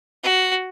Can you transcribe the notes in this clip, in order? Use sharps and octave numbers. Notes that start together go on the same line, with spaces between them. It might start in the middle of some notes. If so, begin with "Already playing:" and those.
F#4